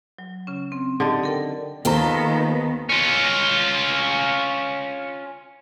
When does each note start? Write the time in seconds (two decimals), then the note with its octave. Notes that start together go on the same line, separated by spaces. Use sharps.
0.19 F#3
0.47 C#3 C#4
0.72 C4
1.00 D3 D#4 G4 D#5
1.23 A4 A#4 G5
1.85 D#2 D#3 B3 F4 A4 C5 A#5
2.89 C#4 F4